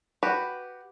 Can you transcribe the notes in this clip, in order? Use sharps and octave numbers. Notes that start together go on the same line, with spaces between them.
F#4 G4 B4